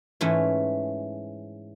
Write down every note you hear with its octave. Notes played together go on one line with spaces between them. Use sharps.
G#2 E3 A3 C#4